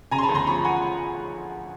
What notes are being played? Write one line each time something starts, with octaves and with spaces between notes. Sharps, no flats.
C#3 G#5 A#5
C6
A5 B5
D2
A#5 C6
F3 B5 C#6
F#5 G#5